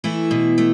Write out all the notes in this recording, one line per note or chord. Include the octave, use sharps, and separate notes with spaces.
E3 A3 E4
B2
A3